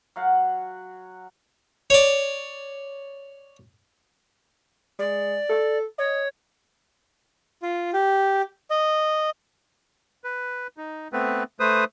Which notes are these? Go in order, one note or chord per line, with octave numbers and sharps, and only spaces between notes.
F#3 F5 F#5
C#5 D5
G#3 D5
A4
C#5 D#5
F4
G4
D#5
B4
D#4
A3 B3 C4 B4
A3 B4 C5 D#6